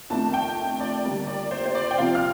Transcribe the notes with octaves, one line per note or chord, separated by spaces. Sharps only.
F2 D#3 A3 D4 A5
G5
D5
D3 G3 A#3
D5
C5
C5
D5
G5
C3 F3 C4 F5
F6